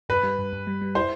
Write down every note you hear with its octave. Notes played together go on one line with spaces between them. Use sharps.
G2 B4
G3
G2
G2
G3
G3
E4 C5